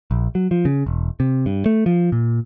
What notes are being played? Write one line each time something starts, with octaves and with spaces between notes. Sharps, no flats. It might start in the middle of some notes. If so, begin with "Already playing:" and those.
A#1
F#3
F3
C#3
E1
C3
G2
A3
F3
A#2